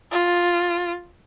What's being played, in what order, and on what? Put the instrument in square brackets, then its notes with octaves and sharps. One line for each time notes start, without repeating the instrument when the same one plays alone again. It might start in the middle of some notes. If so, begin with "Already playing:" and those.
[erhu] F4